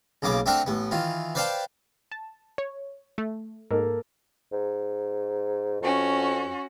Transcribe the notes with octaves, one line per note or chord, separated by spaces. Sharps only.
B1 C#3 A#3 B3 D6
A3 C4 D4 A#4 E5 F#5
A1 B3
D#3 E3 F4
B4 C5 D5 F5 G5 A5
A5
C#5
A3
G#2 A#3 A4 A#4
G#2
F2 C#4 F#4